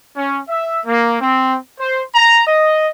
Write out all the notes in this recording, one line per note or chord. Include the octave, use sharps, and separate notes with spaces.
C#4
E5
A#3
C4
C5
A#5
D#5